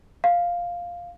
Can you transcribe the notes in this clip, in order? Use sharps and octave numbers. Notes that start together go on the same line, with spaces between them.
F5